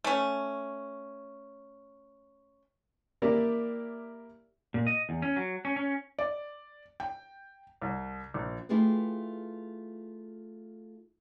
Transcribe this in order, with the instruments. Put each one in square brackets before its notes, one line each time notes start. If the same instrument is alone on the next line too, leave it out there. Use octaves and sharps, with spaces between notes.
[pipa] A3 C#4
[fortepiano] A#3 E4 G4 A#4 D5 E5
[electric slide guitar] A#2
D#5
E2
C#4
F#3
C#4
C#4
[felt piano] D5
G5
C2
A#1
[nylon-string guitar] A3 E4 F4 G4 G#4 B4